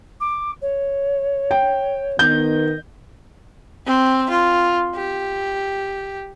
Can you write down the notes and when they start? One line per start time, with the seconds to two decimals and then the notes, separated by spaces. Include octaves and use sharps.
0.20 D6
0.61 C#5
1.51 G5
2.19 D#3 B3 D#5 G6
3.87 C4
4.30 F4
4.95 G4